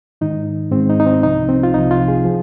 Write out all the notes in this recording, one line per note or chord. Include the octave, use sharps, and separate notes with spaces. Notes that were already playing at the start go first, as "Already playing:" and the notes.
G#2 D#3 D#4
G#2 D#3 C4
D#4
D#4
C4
C2 C3 F3 D#4
C4
F4
C2 C3 F3 D#4
F4
G#4
F3